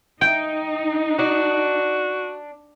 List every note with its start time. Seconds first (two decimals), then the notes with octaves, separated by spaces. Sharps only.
0.21 D#4 G5
1.19 D4 F#4